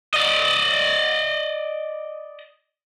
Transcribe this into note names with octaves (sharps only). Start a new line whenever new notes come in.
D5 D#5